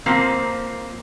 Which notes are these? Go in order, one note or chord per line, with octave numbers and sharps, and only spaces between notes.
F3 A#3 C4